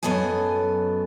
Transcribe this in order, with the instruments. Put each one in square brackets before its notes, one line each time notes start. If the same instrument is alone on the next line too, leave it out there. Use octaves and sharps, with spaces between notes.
[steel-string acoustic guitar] F#2 F#3 B3 A4 D#5 G#5